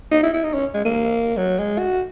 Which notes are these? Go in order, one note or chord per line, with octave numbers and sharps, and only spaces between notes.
D#4
E4
E4
D#4
C#4
G#3
A#3
F#3
G#3
F#4